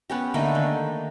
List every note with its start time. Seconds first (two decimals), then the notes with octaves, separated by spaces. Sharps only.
0.10 B3 C#4 G4
0.34 D3 A3 A#3 D#4
0.55 D#3